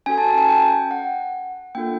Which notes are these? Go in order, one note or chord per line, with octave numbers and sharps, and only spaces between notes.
C#4 F#4 A4 G#5
A5
A5
G#5
G5
F#5
A#3 D4 F4 A4 G5